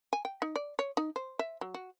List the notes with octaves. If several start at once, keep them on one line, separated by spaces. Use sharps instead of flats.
G#5
G5
D#4
D5
C#5
D#4
C5
E5
F#3
F#4